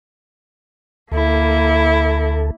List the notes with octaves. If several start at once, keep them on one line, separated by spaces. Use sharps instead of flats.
D2 A#3 E4 A4